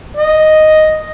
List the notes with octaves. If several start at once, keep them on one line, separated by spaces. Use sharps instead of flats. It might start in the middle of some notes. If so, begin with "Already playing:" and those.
D#5